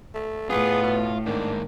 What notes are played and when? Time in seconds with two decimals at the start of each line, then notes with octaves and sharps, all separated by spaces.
0.15 A3
0.50 A2 B3 F4 G#4
0.83 B2
1.26 G#2 D#3 A#3 D4